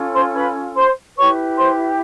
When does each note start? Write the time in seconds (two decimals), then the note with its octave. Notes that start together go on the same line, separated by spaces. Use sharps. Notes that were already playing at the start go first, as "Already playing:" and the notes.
Already playing: C#4 F4 A4
0.14 C5 C6
0.34 B4 B5
0.75 C5 C6
1.16 E4 G4 B4 C#5 C#6
1.57 C5 C6